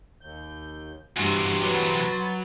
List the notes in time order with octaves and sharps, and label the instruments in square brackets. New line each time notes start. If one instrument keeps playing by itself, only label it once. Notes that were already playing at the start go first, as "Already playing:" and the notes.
[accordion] D#2 G6
[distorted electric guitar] E2 C3 [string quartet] G2 [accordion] F#4 C6 F#6
[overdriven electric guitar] F#3 [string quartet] B4 A6